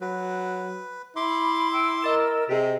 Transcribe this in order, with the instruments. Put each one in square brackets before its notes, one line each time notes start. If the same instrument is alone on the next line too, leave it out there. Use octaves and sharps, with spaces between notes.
[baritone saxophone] F#3 [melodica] B4
[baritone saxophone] E4 [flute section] B5 [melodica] C6 D6
[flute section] G5 E6
[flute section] A#4 E6 [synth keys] D#5 A6 E7
[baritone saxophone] C3 [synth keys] G4 G#4 [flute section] D#5